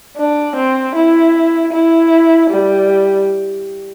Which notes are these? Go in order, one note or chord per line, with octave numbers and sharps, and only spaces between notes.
D4
C4
E4
E4
G3